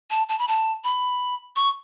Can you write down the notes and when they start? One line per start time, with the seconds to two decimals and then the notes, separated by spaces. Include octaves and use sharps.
0.10 A5
0.29 A5
0.39 B5
0.48 A5
0.84 B5
1.56 C#6